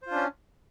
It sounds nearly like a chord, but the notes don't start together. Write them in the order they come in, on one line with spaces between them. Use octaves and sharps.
C5 F4 D4 C#4